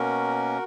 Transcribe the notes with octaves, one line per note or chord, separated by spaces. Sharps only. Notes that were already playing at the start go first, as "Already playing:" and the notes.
Already playing: B2 A#3 C#4 F#4 A#4